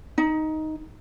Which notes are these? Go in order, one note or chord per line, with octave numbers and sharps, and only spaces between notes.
D#4